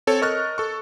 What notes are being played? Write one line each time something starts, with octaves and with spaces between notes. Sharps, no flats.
C4 A4 C#5
A#4 D#5 C#6 F6 F#6 A6
A4 C#6